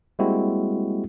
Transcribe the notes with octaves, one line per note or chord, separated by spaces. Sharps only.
G3 G#3 A#3 C4 E4 F#4